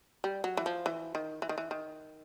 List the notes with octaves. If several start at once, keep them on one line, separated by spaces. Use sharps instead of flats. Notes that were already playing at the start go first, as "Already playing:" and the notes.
G3
F#3
E3
F3
E3
D#3
E3
D#3
E3
D#3